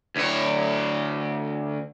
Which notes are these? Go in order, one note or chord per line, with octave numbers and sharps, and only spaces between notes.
D2 C#5